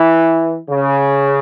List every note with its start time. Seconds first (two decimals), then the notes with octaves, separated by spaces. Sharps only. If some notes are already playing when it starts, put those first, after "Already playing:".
Already playing: E3
0.69 C#3